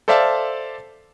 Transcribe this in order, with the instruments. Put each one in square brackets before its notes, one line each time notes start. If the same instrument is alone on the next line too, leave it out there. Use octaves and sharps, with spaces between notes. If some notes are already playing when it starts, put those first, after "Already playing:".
[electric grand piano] A4 C5 D5 E5 F5 A5